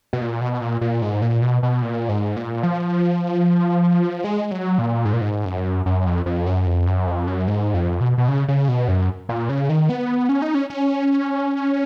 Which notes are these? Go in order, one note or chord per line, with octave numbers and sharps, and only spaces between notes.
B2
A#2
B2
A#2
A#2
G#2
A#2
B2
B2
A#2
G#2
A#2
F3
G#3
F#3
A#2
G#2
A#2
G#2
F#2
F#2
F2
F2
F#2
F2
F#2
F2
F#2
G#2
F2
B2
B2
C#3
C#3
B2
F#2
A#2
C#3
D#3
B3
C#4
D#4
C#4
C#4